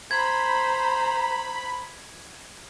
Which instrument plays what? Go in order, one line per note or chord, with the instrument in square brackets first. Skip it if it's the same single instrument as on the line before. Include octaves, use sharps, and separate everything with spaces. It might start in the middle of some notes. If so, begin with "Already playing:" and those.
[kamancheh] C5 A#5 [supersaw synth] B5 [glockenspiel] G#6